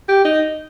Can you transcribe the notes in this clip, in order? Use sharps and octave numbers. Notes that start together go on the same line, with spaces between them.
G4
D#4